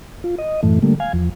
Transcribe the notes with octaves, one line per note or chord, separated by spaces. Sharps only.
F4
D#5
F#2 A2 E3 A3
D3 G3 A3 A#3
F5 G#5
E2 F3